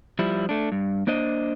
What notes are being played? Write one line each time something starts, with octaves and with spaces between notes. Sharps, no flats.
F3 G3 E4
A3 D4
G2
A#3 D4 C5 D#5